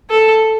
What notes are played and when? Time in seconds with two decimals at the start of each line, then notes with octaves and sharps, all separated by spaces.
0.10 A4